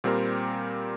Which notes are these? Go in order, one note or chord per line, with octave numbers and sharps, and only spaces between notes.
A#2 G3 C4 G4 A#4